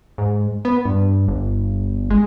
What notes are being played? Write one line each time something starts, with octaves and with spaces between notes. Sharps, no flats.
G#2
B3
G2
G1
G#3